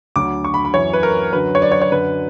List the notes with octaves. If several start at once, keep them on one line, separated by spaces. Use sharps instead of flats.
D2 D3 F#3 D6
C#6
B5
B5
F#2 E3 C#5
B4
A#4
F#2 D3 F#3 B4
C#5
D5
C#5
C#5
F#2 D3 F#3 B4